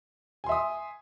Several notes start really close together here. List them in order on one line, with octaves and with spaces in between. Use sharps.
G#5 C6 E5 D#6